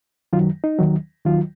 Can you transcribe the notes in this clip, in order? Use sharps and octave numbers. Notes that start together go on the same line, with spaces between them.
F#2 D#3 F#3 F4
D#4
D#2 D#3 F#3
D#2 D#3 F#3 F4